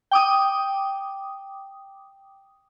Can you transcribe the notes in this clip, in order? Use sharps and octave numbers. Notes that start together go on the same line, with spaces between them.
G5 D6 D#6